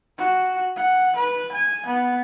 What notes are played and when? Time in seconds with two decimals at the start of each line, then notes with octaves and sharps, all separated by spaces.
0.18 F#4
0.76 F#5
1.16 B4
1.52 G#5
1.86 B3